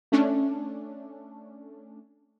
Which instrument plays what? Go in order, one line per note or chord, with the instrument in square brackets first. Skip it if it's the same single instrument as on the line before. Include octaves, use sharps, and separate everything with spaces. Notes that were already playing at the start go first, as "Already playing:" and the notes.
[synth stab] A3 C#4 D4